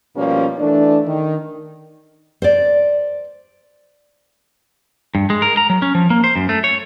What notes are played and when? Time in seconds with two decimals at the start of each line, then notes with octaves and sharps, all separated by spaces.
0.16 B2 F3 G3 A#3 C#4
0.59 E3 A3 D4
1.06 D#3
2.42 C5 D5
5.15 G2
5.30 G#3
5.42 A#4
5.57 A#5
5.70 F#3
5.82 C#4
5.95 F3
6.10 A#3
6.24 C5
6.36 F#2
6.49 A3
6.64 C#5